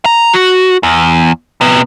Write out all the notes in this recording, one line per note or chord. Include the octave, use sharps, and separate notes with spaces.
A#5
F#4
E2
C3 B3